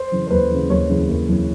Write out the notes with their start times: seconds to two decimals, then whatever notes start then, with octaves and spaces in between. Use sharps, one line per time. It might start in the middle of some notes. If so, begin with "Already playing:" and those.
Already playing: C5
0.12 C#3 E3
0.27 C5
0.31 D#2 B4
0.51 C#3 E3
0.70 D#2 C#5
0.89 C#3 E3
1.09 D#2
1.29 C#3 E3